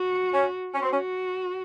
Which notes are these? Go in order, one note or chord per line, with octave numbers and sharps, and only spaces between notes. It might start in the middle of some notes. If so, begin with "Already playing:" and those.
Already playing: F#4
C#4
C#4 F#4
C4
C#4